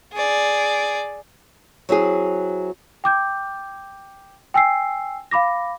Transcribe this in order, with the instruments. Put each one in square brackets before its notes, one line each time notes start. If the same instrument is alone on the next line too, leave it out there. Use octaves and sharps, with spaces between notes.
[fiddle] G#4 D5
[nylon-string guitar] F#3 C4 E4 G#4
[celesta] G5 D6 G6
G5 G#5 E6 C7
F5 B5 D6 A#6